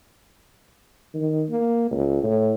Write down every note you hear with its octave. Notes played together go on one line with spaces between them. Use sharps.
D#3
A#3
C#2
A2